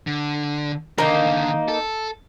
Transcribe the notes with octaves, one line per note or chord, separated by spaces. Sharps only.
D3
D3 D#3 A#3 D#4
A4